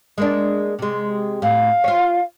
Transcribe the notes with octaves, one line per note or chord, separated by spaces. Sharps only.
G#3 A#3 D4
C3 G#3
A2 F5
F4 C5 C#5